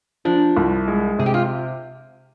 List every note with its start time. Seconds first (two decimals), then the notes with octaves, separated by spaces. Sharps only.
0.25 F3 D4
0.57 C2
0.88 G#3
1.19 C3 G#4
1.26 G4
1.34 F4